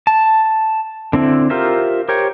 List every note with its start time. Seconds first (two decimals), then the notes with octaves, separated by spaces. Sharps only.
0.07 A5
1.13 D3 C4 E4
1.50 F4 G4 A#4 C5 E5
2.09 G4 A#4 C5 C#5 G5